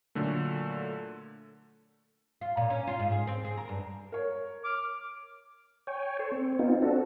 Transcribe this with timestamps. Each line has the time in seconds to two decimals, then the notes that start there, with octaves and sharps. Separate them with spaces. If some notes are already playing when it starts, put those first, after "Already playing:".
0.15 A#2 D3 F#3 A3
2.41 F4
2.57 A#2
2.70 C#4
2.87 F4
2.99 G#2
3.12 G#4
3.27 C4
3.44 G#4
3.57 A#4
3.69 G2
4.12 A#4 C#5
4.64 D6 F6
5.87 C#5 G5 G#5
6.19 A4 C5 C#5
6.32 C4
6.59 B3 C4 D#4 F4
6.82 C4 D4 F#4 A4